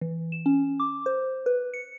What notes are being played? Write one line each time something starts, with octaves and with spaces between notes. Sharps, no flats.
E3
E7
C#4
D6
C5
B4
C#7